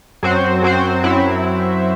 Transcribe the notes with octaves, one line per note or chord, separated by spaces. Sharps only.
F#2 F#3 C4 F#4 C5
F#2 F#3 C4 F#4 C5
F#2 F#3 C4 E4